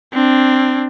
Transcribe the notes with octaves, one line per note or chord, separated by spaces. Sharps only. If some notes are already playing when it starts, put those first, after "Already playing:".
C4 D4